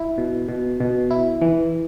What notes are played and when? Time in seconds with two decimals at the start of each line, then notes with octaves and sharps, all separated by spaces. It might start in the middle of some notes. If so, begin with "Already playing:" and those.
Already playing: E4
0.18 B2
0.48 B2
0.80 B2
1.11 E4
1.42 E3